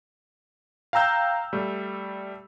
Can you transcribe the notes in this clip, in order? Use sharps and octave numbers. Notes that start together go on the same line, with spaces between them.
F5 G5 A#5 E6 G6
G3 A3